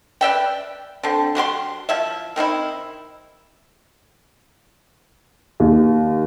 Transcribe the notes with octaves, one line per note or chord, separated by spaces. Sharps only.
B4 D5 E5 G5
D3 C4
F#3 F#4 G4 C6
F3 E4 E5
D#3 C4 D#4 E4
D#2